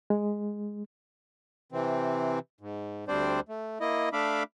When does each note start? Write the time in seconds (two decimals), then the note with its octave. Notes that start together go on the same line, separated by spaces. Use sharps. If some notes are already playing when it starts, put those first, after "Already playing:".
0.10 G#3
1.72 C3 E3 C4
2.61 G#2
3.08 D2 G3 C4 D4 C5 D5
3.49 A3
3.80 A#3 E4 D#5
4.13 A3 D4 E5 F5 B5 D6